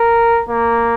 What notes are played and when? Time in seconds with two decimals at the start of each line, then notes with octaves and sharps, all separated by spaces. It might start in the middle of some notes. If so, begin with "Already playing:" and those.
Already playing: A#4
0.49 A#3